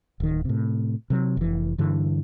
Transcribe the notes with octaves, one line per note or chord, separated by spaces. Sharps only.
D1 D#3
A2 C3
C3 F#3
F1 E3
G2 D3 E3